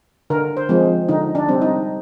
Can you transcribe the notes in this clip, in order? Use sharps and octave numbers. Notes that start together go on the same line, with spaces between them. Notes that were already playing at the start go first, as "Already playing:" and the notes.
D3 A#4
C5
F3 G#3 C4
D3 D#4
D4
G3 C4
D#4